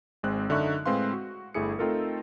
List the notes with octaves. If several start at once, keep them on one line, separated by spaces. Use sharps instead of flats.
G#1 G#3 C4 F#6
F#2 D3 D#4 E5 C#6 F#6
A2 G#3 C4 B4 F5 C6
F#4
G1 A3 E4 G#4 C#7
A3 C4 D#4 F4 A4 A#4